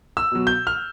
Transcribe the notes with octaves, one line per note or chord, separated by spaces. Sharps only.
E6
B2 F#3
G6
F6